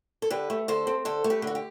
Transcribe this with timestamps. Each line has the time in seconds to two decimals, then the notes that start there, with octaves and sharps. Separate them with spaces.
0.22 A4
0.30 D3 G4 B4
0.50 A3
0.68 D3 A4 C5
0.87 C4
1.05 D3 A4 C5
1.24 A3
1.30 G4 B4
1.42 D3 F#4
1.55 G4